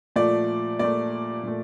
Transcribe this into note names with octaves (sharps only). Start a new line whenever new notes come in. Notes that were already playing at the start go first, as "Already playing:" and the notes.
A#2 F3 A3 D5
A#2 F3 A3 D5
A#2 F3 A3